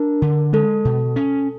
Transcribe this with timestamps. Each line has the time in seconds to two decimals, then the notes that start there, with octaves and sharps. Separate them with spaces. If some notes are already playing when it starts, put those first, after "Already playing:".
Already playing: D4 A#4
0.22 D3
0.53 G#3 A4
0.85 B2
1.16 C#4